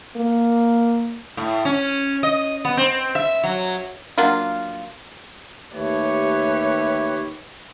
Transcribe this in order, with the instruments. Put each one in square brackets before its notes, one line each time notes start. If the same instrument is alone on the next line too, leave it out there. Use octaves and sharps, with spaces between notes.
[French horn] A#3
[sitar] A2
C#4
D#5
B3
C4
E5
F#3
[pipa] F#3 A#3 D4 F4
[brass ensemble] D#2 A3 G4 B4 C#5